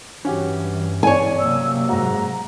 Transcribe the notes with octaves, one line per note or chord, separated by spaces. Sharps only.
G2 E3 C#4 F#4 G4
C#5 D5 G#5
C3 F#3 A#3 E6
G#2 G#3 F#4 A#5